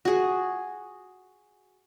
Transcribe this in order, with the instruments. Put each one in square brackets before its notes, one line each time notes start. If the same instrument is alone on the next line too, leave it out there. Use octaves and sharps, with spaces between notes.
[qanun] F#4 G#4